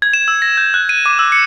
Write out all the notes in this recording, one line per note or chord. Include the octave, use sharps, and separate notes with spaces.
G#6
E7
E6
A#6
G6
F#6
D#7
D6
E6
C#7